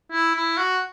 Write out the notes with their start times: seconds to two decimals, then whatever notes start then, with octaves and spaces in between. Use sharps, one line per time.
0.12 E4
0.35 E4
0.57 F#4